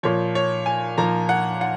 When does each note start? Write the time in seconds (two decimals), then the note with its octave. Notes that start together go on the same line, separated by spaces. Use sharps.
0.03 A#2 F3 C#5
0.35 C#5
0.66 G#5
0.97 A#2 F3 A#5
1.29 F#5
1.61 F#5